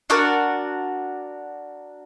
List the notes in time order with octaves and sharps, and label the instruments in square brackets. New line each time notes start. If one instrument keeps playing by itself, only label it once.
[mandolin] D4 F#4 A#4 D5